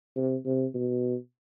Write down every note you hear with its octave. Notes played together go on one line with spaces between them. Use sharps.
C3
C3
B2